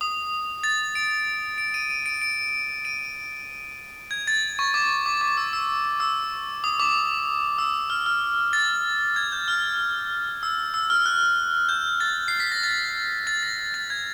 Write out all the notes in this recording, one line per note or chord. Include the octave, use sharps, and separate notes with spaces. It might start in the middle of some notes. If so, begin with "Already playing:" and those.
D#6
A6
D7
D7
D#7
D#7
D7
D7
D#7
G#6
A6
C#6
D6
D6
D6
E6
E6
E6
D#6
D6
E6
F6
F6
A6
G#6
G6
F6
E6
E6
F6
F#6
G6
A6
C7
B6
A#6
A6
A6
A#6
A6
G#6